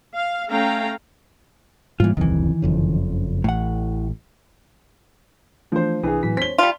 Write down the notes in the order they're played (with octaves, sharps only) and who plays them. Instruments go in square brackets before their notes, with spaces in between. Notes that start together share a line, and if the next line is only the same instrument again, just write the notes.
[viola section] F5
A3 C#4 F5 G5 A#5
[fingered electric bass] G#2 G3 A#3 [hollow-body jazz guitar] E3 F4
[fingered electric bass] D#1 C2 F2 [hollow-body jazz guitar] D#3 E3
[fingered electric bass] F#1 F2 C#3
[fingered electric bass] A1 [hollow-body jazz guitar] A2 F#5
[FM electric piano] E3 A3 D4 [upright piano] F3 C5
[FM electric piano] C2 D4 D#6 [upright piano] E3 G#4
[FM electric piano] A2 F#3 B6 [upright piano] E3
[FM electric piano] C5 C#5 [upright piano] B6 G7
[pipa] G3 F4 [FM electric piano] D5 A5